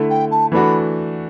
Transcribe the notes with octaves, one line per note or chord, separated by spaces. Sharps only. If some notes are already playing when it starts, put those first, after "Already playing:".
Already playing: D3 A3 E4
G5
A5
E3 A3 D4 F#4 B5